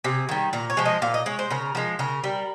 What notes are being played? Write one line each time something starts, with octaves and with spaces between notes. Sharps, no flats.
C3 G#4
D#3 G3
A#2 A#4
C#5
F3 G#3
D#5
A#2 F5
D#5
G#3 C#5
C5
C#3 A#4
F3 G#3
C#3 A#4
G3